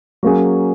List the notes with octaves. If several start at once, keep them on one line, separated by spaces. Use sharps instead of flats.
F#3 A#3 C#4 G#4